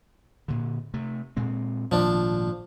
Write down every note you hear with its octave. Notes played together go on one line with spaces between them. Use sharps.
A#2 D3
C3 A3
A#2 G#3 C4
G#1 A#2 F3 D4